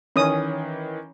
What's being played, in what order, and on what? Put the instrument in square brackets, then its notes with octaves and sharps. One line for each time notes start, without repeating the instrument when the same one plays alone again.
[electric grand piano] D#3 E3 [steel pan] C#4 D#6